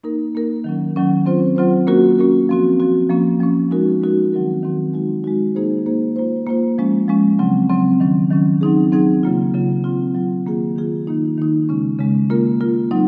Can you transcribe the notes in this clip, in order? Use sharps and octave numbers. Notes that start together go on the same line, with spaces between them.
A#3 D#4 A#4
A#3 D#4 A#4
D#3 F#3 C#4
D#3 F#3 C#4
F#3 C4 F4 C5
F#3 C4 F4 C5
A#3 C#4 F#4 A#4
A#3 C#4 F#4 A#4
F3 C4 F#4
F3 C4 F#4
F3 A#3 C#4
F3 A#3 C#4
G#3 D#4 F#4 A#4
G#3 D#4 F#4 A#4
D#3 F#3 C4 F#4 A#4
D#3 F#3 C4 F#4 A#4
G#3 D#4 F#4
G#3 D#4 F#4
A#3 D#4 G#4 C5
A#3 D#4 G#4 C5
A#3 F4 C5
A#3 F4 C5
F3 G#3 C#4
F3 G#3 C#4
C#3 F#3 C4
C#3 F#3 C4
D#3 F#3 C#4
D#3 F#3 C#4
F#3 C4 D#4 G#4
F#3 C4 D#4 G#4
C#3 F#3 A#3 F4
C#3 F#3 A#3 F4
F#3 C4 F4
F#3 C4 F4
D#3 A#3 F4 G#4
D#3 A#3 F4 G#4
D#3 A#3 D#4
D#3 A#3 D#4
C#3 G#3 C#4
C#3 G#3 C#4
A#3 F4 A#4
A#3 F4 A#4
F#3 C4 D#4